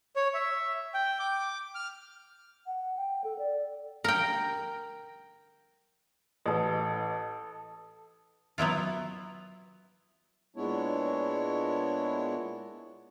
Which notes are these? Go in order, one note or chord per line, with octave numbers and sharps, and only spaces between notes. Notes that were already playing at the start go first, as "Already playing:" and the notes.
C#5
E5
G5
D6
F6
F#5
G5
A4
D5
A#4 G5
A1 A4 D#5
F#3 B3 E4 F4
A#2 G#3 B3 D4 E4 C#5